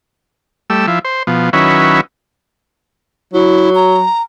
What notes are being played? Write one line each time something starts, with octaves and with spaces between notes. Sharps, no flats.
G3 A3 E6
F3 E4
C5
B2 F3
D#3 F#3 C#4 E4 B4
F#3 E4
A#5